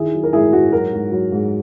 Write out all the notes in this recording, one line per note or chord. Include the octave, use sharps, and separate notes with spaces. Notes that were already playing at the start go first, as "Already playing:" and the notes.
Already playing: D#3 E4 G#4
F#3
A#4
G#2 E4 G#4
G#2 F#4
F#3 F#4 A#4
G#2
F#3
G#2